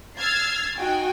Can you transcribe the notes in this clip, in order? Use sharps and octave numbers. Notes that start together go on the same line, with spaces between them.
E6 F6 G#6 A6 C7
D#4 F#4 G5 G#5